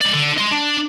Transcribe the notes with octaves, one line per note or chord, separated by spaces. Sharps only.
G#3 D5
D3
D#5 C6
D4